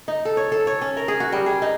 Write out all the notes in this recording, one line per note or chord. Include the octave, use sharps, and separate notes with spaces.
D#4
A4
C#5
A4
C#5
C#4
A#4
G#4
F#4
G3
G#4
D#4